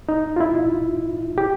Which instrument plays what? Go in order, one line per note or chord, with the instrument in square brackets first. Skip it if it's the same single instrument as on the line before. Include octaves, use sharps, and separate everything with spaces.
[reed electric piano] D#4
F4
E4
G4